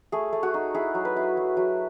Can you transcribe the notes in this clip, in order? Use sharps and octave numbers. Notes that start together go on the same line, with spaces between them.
A3 G#4
A3
F#4
D#4
E4 G#4
F#3
B4
E4
F#3
F#3